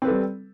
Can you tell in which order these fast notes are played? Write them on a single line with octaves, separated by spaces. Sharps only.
C4 B4 A4 G3